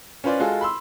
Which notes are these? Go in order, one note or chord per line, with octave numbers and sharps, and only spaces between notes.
C#4 F4 B4 C5 D5
G#3 F4 F#4 G#4 A4
B5 C6 E6